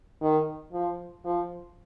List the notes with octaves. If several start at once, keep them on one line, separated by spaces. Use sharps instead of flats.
D#3
F3
F3